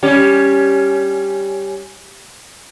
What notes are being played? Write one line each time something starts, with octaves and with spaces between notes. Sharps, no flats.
G3 C#4 G4